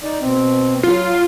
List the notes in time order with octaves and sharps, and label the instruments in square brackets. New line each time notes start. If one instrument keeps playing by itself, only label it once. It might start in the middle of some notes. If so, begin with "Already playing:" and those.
[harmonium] D#4 D5
B2 C4
[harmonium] F#3 [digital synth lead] F4